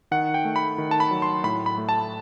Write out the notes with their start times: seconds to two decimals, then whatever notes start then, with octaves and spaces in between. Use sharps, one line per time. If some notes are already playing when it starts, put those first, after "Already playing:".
0.11 D#3 F#5
0.34 G5
0.45 A3
0.56 B5
0.78 D#3
0.91 A5
1.00 B5
1.11 F#3
1.22 C6
1.44 A2 B5
1.66 B5
1.78 A3
1.89 A5